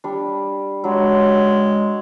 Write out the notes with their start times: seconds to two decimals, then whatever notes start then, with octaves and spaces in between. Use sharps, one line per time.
0.04 G3 D4
0.84 F#3 G#3 D4